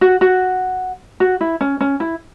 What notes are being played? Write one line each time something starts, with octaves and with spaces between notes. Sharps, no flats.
F#4
F#4
F#4
E4
C#4
C#4
E4